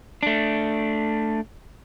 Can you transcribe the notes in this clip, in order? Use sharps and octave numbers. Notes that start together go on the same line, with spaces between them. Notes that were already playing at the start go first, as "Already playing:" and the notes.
A3 D4